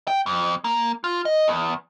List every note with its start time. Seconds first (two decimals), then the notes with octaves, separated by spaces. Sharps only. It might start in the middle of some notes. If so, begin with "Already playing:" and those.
0.07 G5
0.26 F2
0.64 A#3
1.04 F4
1.25 D#5
1.48 E2